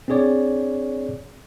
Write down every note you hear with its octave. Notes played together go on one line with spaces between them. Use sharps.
C4 D4 G#4 C#5 D5